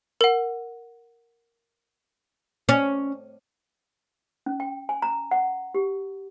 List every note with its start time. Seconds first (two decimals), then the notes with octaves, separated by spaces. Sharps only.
0.21 A#4 F#5
2.69 C#4
4.46 C#4
4.60 G5
4.89 G#5
5.02 A#5
5.31 F#5
5.75 G4